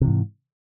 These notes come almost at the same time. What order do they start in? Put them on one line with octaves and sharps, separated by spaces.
C3 E3 G#2